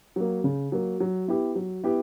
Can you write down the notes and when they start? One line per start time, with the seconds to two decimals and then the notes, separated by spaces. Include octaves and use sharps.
0.16 F#3 A#3
0.44 C#3
0.72 F#3 A#3
1.00 F#3
1.28 B3 E4 G4
1.55 F#3
1.84 B3 E4 G4